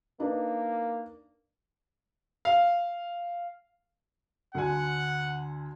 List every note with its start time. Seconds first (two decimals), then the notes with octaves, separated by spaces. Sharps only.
0.20 A#3 D4 D#4 B4
2.45 F5
4.54 D2 D3 F#5 G#5